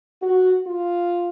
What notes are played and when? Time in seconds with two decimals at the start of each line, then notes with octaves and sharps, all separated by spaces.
0.22 F#4
0.67 F4